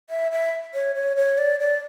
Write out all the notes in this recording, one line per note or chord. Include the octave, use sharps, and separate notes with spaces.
E5
E5
C#5
C#5
C#5
D5
D5